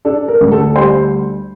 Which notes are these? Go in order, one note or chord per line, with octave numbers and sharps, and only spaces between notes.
D4 A4
A#4
D2
A4
G3 C5